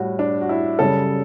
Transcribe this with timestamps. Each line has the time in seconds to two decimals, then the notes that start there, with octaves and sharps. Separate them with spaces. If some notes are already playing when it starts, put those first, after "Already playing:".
Already playing: A2 G3 F#4
0.19 D4
0.41 F#4
0.49 E4
0.79 F#2 C#3 G3 A4